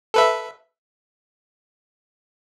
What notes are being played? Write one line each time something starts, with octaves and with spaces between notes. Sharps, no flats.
A4 B4 E5